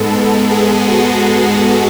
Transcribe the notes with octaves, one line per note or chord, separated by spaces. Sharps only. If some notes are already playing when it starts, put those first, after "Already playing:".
Already playing: G#2 G#3 B3 A4
A4
G#4
F#4